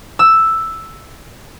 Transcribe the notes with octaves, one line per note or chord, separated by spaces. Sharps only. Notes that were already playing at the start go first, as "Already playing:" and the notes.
E6